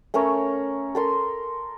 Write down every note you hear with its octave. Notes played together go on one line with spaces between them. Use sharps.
A3 C#4 A#4 C#5
A4 A#4 C6